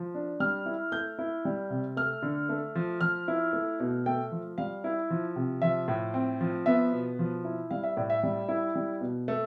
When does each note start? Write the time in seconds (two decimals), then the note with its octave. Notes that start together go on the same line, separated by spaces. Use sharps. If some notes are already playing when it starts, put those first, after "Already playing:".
Already playing: F3
0.15 D4
0.40 G3 F6
0.66 E4
0.92 A3 G6
1.19 E4
1.45 G3
1.70 C3
1.97 A3 F6
2.23 D3
2.49 A3
2.75 F3
3.01 F3 F6
3.28 E4
3.53 A3
3.80 B2
4.06 A3 G5
4.32 F3
4.58 G3 F5
4.84 E4
5.10 F3
5.36 C3
5.62 F3 E5
5.88 A2
6.14 C4
6.41 F3
6.66 B3 E5
6.92 B2
7.19 F3
7.45 E4
7.71 G3 F5
7.84 E5
7.97 A2 D5
8.10 E5
8.23 G3
8.49 E4
8.75 G3
9.01 B2
9.28 A3